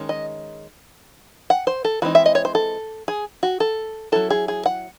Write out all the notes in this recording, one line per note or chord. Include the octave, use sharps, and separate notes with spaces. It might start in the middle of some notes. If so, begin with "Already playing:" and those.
Already playing: D#3 G#3 C#4
D#5
F#5
C5
A4
E3 G#3 C4 D#4 F#4
E5
D#5
C#5
C5
A4
G#4
F#4
A4
F#3 C#4 E4 A4
G#4
G#4
F#5